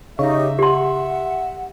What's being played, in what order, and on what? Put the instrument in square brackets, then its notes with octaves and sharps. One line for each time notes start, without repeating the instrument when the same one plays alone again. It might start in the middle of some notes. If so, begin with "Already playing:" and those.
[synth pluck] C#3 [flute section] D#4 G4 D#5 [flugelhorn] E5
[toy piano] G4 C6 [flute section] F#5